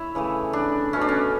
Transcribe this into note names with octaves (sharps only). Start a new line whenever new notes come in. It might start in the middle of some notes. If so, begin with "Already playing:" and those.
Already playing: E4 C#5 E5
C#3 E3 A3
D4
B2 A3 C#4
D4
C#4